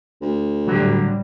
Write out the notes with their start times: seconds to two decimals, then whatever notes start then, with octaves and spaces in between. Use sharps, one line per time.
0.22 D2
0.67 A2 D3 F#3 G3